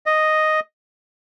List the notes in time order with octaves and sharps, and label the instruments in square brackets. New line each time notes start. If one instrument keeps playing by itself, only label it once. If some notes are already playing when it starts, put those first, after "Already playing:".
[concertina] D#5